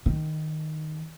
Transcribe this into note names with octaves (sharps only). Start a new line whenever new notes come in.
D#3